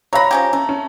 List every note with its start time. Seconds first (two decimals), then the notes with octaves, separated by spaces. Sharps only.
0.13 F#3 C#5 F5 A#5 B5 A#6
0.31 F3 C#4 G4
0.53 A3 C#4
0.69 C#4